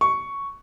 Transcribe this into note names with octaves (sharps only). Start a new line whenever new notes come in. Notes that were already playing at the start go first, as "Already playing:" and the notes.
C#6